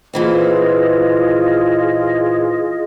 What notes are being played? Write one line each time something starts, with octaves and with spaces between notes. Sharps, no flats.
A#2 E3 C4 F4 G#4 D#5